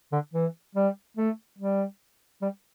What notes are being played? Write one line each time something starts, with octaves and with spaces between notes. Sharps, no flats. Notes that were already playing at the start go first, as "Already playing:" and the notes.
D3
E3
G3
A3
G3
G3